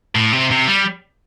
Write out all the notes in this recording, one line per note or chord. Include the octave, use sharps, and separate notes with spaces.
A2
C3
C3
G3